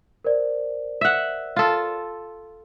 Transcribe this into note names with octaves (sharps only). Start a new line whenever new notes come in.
A#4 C5 D5
E5 F#5
F4 A4